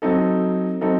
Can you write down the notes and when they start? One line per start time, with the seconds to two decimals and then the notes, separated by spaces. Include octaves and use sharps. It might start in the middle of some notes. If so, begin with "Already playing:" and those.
0.02 F#3 C4 D#4 A4
0.81 F#3 C4 D#4 A4